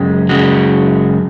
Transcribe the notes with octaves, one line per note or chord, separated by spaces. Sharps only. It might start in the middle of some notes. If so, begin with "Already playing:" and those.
Already playing: F#2 C#3 G#3
F#2 C#3 G#3 F#4